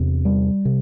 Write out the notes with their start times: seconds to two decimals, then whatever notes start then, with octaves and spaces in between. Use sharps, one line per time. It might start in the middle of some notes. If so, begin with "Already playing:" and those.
Already playing: E2 C3
0.25 G3
0.65 C3